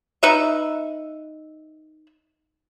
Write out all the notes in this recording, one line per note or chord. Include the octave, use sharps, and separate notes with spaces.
D#4 B4 E5